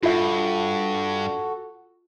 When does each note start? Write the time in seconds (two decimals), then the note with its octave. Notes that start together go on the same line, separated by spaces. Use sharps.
0.03 G2 F4 F#4 A4 E5